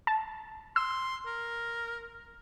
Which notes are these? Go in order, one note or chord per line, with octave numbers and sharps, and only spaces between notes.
A5
C6 E6
A#4